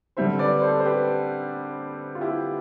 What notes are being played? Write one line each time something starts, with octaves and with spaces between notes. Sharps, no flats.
D3 G3 C4 C5 E5
B4 D5
A4 C5
C5
G4 B4
F4
E4 G4